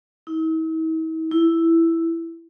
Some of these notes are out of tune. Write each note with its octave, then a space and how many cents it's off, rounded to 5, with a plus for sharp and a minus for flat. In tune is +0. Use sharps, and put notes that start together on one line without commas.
E4 -45
E4 +5